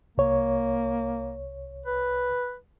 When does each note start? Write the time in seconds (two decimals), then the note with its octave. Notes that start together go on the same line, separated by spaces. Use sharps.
0.18 C2 A#3 C#5
1.86 B4